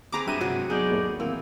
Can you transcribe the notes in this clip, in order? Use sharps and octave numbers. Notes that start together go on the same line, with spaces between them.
C4 G#4 B4 A#5 D6
G2 F#4 G4 E5 D#7
G#2 C3 F#3 F#4
F#3 B3 D#4 G#4 D5
D#2 A2
E3 A#3 C4